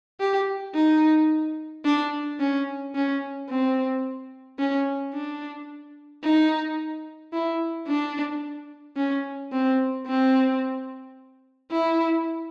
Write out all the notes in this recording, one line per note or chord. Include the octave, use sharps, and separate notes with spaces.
G4
D#4
D4
C#4
C#4
C4
C#4
D4
D#4
E4
D4
C#4
C4
C4
E4